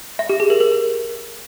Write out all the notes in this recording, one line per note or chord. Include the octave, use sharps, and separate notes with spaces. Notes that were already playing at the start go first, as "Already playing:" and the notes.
E5
G4
G#4
A#4
A#4